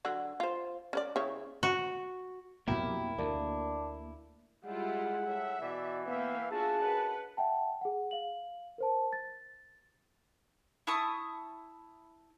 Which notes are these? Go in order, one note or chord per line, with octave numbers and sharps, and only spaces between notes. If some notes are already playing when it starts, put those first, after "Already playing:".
D3 F#3 F#5
F4 C5
C#4 B4 D5
C#3 E4 C#5
F#4
F2 B2 F#3 A#3 E4 G4 A#4
D2 A#3 D4
G3 G#3 E4 F4 F#5
A2 E5
B2 E3 D5
A#3 B3 E5 F5 G5
D4 F4 F#4 G#4 E5 A5
F#2 B4 F#5
E5 F#5 G5 A5
G#4 F#5
F5 F#7
A#4 C5 A5
A6
E4 A5 C#6 D#6